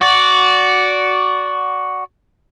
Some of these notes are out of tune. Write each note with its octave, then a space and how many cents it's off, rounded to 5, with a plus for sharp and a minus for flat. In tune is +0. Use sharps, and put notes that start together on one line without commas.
F#4 +0 D5 -15